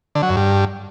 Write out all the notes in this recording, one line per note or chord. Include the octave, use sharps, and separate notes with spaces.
D3
F#3
F#2
G2